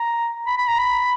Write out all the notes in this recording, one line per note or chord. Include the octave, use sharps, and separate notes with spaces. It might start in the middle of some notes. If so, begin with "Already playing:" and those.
Already playing: A#5
B5
B5
A#5
B5